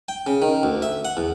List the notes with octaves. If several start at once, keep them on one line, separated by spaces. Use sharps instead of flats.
G5
C#3
D#3
D2
E5
F#5
E2